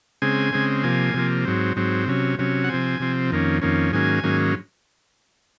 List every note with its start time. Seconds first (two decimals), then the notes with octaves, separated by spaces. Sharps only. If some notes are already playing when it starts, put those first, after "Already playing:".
0.22 C#3 G#3 C4 G#5
0.53 C#3 G#3 C4
0.84 C3 F3 A#3 G#5
1.14 C3 F3 A#3
1.45 G#2 F#3 C4
1.76 G#2 F#3 C4
2.07 C3 F#3 C#4
2.39 C3 F#3 C#4
2.64 F#5
2.69 C3 F3 C4 G#5
3.00 C3 F3 C4
3.32 F2 D#3 A#3 C#4
3.62 F2 D#3 A#3 C#4
3.92 G#2 D#3 F#3 A#3 C#4 G#5
4.23 G#2 D#3 F#3 A#3 C#4